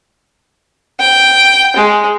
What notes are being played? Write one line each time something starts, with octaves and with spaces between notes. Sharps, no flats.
G5
G#3